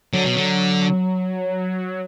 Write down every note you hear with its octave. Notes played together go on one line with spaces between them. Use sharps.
D3 F#3
B2
D3